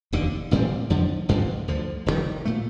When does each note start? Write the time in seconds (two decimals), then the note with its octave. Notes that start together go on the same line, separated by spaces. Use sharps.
0.13 F1 D#2 D3
0.51 A1 A2 G3 C4
0.90 F2 D3 F3
1.29 A1 G2 D3 F3
1.68 D2 D3 F3
2.06 F1 D#2 D#3 G3
2.45 A#2 A3